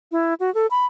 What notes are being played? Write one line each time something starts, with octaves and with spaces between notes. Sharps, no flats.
E4
F#4
A4
B5